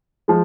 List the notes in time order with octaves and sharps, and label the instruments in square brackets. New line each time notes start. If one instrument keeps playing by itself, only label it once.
[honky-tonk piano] F3 G#3